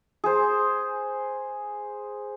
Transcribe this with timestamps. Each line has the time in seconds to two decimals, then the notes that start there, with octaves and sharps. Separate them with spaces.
0.24 G#4 C5